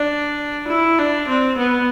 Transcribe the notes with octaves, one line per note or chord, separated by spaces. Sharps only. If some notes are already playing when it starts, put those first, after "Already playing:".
Already playing: D4
E4
D4
C4
B3